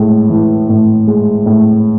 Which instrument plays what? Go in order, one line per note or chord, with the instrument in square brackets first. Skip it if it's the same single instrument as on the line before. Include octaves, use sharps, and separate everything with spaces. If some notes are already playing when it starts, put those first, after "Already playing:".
Already playing: [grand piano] A2 G#3
E3
A2
G#3
A2